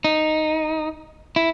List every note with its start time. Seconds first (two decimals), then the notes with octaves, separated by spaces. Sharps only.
0.04 D#4
1.36 E4